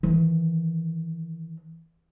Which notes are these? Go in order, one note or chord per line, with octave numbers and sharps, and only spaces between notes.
D#3 E3